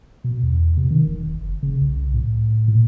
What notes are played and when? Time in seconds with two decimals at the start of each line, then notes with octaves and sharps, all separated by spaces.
0.24 B2
0.43 E2
0.77 C3
0.91 D#3
1.07 E1
1.34 F#1
1.63 C#3
1.81 C2
2.14 A2
2.68 A#2